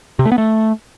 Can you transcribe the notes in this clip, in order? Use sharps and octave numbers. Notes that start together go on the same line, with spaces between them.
C3
A3
B3
A3